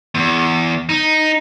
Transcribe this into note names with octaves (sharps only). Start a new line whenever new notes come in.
E2
D#4